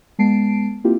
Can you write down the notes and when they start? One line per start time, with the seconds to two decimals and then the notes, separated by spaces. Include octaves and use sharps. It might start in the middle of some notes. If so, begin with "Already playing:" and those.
0.19 G#3 B3 A5 C7 D7
0.84 A#3 C4 E4 F4 G4